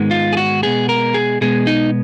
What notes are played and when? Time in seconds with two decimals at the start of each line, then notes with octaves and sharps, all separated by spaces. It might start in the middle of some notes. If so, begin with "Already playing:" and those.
Already playing: G#2 D#3 G#3 B3
0.11 F4
0.33 G#4
0.37 F#4
0.63 B2 G#3 B3 G#4
0.89 A#4
1.14 G#4
1.41 B2 G#3 B3 G#4
1.67 D#4